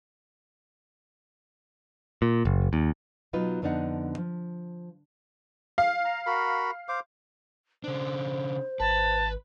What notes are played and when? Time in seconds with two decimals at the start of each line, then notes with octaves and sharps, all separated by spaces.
2.22 A#2
2.45 F#1
2.73 D#2
3.33 B2 F#3 D#4 F4 B4
3.62 F2 D3 B3 D4 D#4 F#5
4.18 F3
5.78 F5
6.05 A#5
6.26 F#4 A#4 B5
6.89 C5 F5 D6
7.84 C#3 D4 C5
8.80 G#1 B4 A5